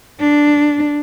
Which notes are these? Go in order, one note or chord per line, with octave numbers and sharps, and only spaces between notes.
D4